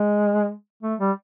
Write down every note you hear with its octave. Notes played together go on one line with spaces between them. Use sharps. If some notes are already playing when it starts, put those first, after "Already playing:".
Already playing: G#3
A3
G3